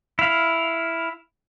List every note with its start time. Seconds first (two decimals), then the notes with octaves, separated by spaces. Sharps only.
0.19 E4 F5